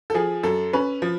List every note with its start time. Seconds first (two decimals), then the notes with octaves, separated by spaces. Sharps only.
0.10 A4
0.14 F3 G#4
0.43 F#2 A4
0.73 C#4 B4
1.02 F3